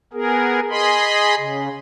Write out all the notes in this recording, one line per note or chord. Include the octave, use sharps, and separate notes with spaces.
B3 G#4 A#4
G#4 D#5 B5 C6
C#3